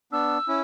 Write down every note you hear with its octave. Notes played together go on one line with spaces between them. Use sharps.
B3 D4 E6
C#4 E4